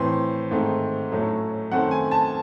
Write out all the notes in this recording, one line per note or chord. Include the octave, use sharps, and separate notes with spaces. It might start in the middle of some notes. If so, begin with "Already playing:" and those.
Already playing: A2 E3 C4 C6
G#2 D#3 A3 C4
A2 F#3 A3 C#4
F#2 D#3 A3 C4 F#5
G#5
A5